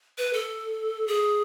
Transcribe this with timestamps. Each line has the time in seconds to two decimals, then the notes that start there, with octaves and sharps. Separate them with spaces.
0.18 B4
0.33 A4
1.08 G#4